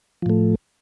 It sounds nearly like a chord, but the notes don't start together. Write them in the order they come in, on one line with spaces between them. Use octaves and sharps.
F3 A2 A3